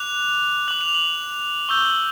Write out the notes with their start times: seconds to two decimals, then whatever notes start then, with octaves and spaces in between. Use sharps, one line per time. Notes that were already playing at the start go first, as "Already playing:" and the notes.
Already playing: D6 F#6 F7
0.68 D6 F#6 F#7
0.81 F7
0.94 F#7
1.69 C#6 E6 G6 G7
1.85 F#7